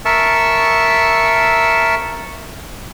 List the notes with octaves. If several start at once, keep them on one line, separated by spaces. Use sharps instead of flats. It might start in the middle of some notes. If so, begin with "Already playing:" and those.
A#4 E5 A5 C#6 E6